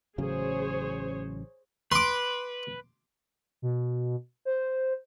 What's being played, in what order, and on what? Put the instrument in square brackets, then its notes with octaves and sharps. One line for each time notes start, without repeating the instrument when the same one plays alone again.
[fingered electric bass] A1 C#3 F#3 [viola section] G#4 C5 C#5
[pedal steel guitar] B4 [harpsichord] C6 D6
[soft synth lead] B2
C5